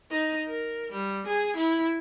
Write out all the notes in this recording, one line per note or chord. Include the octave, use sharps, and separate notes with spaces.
D#4
A#4
G3
G#4
E4